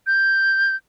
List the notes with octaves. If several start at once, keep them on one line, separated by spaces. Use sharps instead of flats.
G6